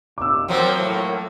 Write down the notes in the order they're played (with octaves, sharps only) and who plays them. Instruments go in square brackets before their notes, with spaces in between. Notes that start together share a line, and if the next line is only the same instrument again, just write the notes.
[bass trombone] D#2 [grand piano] D6 E6
[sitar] F3 F#3 A#3 [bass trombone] C4
[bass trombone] A2